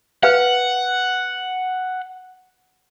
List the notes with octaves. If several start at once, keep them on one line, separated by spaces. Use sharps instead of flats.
B4 F5 F#5